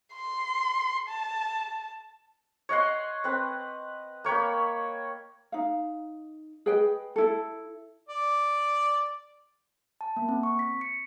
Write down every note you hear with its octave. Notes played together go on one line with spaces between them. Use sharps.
C6
A5
C#5 D#5 F#5 C6
C4 B4
A#3 C#5 G5 B5
D#4 F5
G#4 B4 D#5 G5
E4 A4
D5
A5
A#3
C4
C#6
B6
C#7